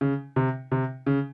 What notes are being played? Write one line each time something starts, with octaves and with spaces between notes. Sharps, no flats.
C#3
C3
C3
C#3